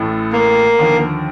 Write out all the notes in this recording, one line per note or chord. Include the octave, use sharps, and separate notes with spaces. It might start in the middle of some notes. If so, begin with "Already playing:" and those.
Already playing: A1 A2 A3
A#3
D#2 D3 F3